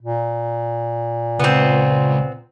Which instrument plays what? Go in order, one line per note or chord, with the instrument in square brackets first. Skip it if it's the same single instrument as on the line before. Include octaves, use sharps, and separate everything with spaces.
[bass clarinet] A#2
[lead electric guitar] C#2 [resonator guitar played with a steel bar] B3 C4